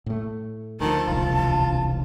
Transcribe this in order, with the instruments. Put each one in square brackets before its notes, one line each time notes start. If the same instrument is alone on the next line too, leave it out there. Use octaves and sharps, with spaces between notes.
[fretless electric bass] A2 A3
[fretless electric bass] D2 F3 [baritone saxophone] D#3 [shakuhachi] A5
[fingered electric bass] E1 C2 [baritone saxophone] F4